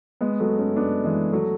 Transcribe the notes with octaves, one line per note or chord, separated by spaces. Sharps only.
G#3 B3
F#3 A3
A3 C#4
B3 D4
E3 G#3
F#3 A3